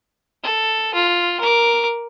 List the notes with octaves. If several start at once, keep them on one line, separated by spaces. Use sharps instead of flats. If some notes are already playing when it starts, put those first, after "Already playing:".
A4
F4
A#4 D6